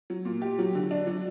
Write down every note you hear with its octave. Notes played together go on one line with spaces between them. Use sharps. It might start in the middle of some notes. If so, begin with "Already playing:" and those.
F#3
A#2
G4
F#3
D3
D4
F#3